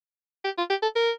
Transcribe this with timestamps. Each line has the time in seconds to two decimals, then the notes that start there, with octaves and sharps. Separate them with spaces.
0.45 G4
0.58 F4
0.70 G4
0.83 A4
0.96 A#4